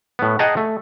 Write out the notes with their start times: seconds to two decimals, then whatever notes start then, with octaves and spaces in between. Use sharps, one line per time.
0.19 A2 B3
0.39 G#4 D#5 F#5 G5 A5 A#5
0.57 A3